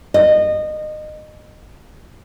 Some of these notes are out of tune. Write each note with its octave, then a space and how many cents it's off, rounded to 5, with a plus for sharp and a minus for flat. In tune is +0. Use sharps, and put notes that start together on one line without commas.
D#5 -25